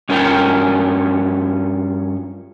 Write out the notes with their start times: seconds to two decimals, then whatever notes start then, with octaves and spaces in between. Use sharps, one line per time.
0.09 G2 C#4 F4 A#4 G5